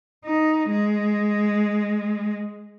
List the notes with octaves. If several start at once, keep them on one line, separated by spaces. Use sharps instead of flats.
D#4
G#3